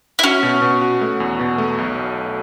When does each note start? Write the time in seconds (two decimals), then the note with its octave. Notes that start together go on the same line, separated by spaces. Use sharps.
0.19 E4
0.23 C#4 F#4
0.43 B2
0.62 B2
0.81 F#4
1.01 A3
1.20 E2
1.39 B2
1.58 A3
1.78 B1